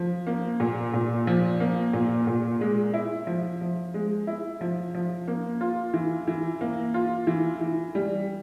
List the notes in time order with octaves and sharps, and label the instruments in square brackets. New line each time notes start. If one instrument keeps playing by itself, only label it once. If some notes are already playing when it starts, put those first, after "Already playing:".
Already playing: [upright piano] F3
A#3
A#2
A#2
F3
A#3
A#2
A#2
G#3
E4
F3
F3
G#3
E4
F3
F3
A#3
F4
E3
E3
A#3
F4
E3
E3
G3